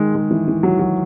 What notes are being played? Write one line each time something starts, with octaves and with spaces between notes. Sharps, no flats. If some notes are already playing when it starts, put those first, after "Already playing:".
Already playing: D#3 G#3
G#3
E3
E3
F#3
F#3